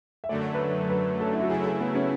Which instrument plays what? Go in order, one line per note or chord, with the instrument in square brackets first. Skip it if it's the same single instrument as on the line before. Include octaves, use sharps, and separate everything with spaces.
[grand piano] E5
[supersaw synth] F#2 D3 F#3 A3 [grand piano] D5
[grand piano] B4
C#5
B4
A4
E4
F#4
[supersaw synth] C#3 F#3 A3 E4 [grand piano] G#4
[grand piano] G#4
B3
C#4